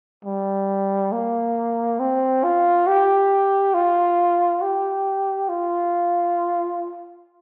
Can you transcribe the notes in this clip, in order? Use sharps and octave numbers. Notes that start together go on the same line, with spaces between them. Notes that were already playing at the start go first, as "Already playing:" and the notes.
G3
A#3
C4
F4
G4
F4
G4
F4